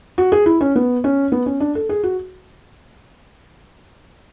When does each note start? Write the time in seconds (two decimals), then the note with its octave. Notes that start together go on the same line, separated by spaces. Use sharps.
0.18 F#4
0.32 G#4
0.46 E4
0.61 C#4
0.76 B3
1.04 C#4
1.32 B3
1.46 C#4
1.60 D4
1.75 A4
1.89 G#4
2.04 F#4